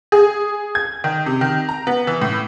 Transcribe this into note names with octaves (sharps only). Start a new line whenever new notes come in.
G#4
G#6
D#3
C3
D#3
A#5
B3
E3
A2